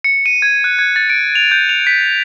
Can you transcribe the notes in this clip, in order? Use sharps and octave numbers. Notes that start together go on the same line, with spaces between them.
C#7
D#7
G#6
F#6
G#6
A6
D7
F7
G6
F7
B6